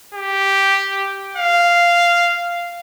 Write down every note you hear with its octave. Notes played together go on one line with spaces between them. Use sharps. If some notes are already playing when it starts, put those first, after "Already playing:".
G4
F5